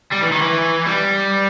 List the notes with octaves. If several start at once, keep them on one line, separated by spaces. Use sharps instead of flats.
G3
E3
D#3
E3
G3